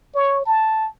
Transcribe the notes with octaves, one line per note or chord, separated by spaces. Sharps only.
C#5
A5